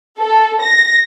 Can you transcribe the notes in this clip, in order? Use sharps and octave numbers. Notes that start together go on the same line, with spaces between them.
A4
A#6